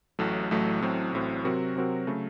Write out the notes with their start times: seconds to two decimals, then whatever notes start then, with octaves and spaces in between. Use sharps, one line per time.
0.19 A1 A2 F#3 A3
0.51 A1 A2 F#3 A3
0.81 A1 A2 F#3 C4
1.13 A1 A2 F#3 C4
1.44 C3 F#3 C4 F#4 A#4
1.76 C3 F#3 C4 F#4 A#4
2.07 C#3 F#3 A3